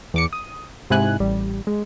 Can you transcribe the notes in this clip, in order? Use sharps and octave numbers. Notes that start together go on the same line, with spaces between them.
E2 D6 C#7
D#6
G#2 C3 E4 G#5 F#6
A1 G3
G#3